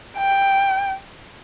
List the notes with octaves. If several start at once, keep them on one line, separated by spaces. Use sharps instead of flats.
G5